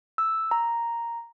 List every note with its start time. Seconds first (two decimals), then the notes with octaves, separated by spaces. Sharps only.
0.18 E6
0.51 A#5